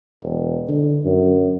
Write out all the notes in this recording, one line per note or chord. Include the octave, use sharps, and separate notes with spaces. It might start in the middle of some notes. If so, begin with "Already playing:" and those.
E1
D3
F#2